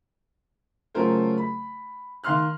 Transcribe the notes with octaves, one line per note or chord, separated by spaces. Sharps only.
C#3 F#3 A3 F4 A#4 C5
B5
D#3 F5 C6 F6 F#6